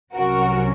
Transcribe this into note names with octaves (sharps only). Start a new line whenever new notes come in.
C2 C3 F#3 C#4 F#4 A#4